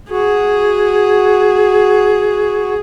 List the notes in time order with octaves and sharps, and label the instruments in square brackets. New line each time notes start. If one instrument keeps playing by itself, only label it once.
[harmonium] F#4 [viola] G#4